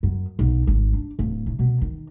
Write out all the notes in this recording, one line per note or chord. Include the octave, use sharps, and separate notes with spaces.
F#2
B1
G#1
D4
D1
A2
B2
D#3